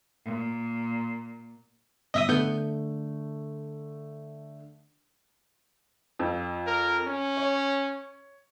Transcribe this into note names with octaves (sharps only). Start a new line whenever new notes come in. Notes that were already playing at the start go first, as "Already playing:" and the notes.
A#2
G1 D#5 E5 D#6
D3 A3 B3 G6
F2
A#4
C#4
C#5